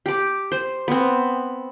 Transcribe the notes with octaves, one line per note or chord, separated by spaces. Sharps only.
G4 D6
C5
B3 C4